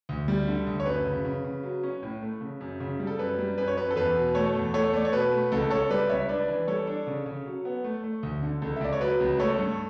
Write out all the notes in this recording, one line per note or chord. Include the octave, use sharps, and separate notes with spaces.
D2
G3
D3
D2
C#5
F#2 B4
C#3
C#3
C#3
F#3
C#4
A2
A3
C#3
F#2
C#3
G3
A4
F#2 B4
G3
F#2 B4
C#5
F#2 B4
A4
E2 B4
B2
A3 A4 C#5
E2
A3 A4 C#5
A3 D5
C#5
B2 B4
A3
C#2 A4
C#2 A4 C#5
G3 B4 D5
C#2 C#5 E5
D4 B4 D5
E3
G3 A4 C#5
D4
C#3
C#3
F#3
B3
A3
A3
D2
D3
C#2 A4
E5
C#2 D5
C#5
F#3 B4
C#2
A3 A4 C#5
G2